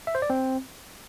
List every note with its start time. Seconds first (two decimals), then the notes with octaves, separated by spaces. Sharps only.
0.07 E5
0.15 C5
0.22 D5
0.30 C4